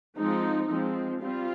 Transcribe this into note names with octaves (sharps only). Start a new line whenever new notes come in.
F3 G#3 C4 D#4
F3 G#3 C4
G3 C4 F4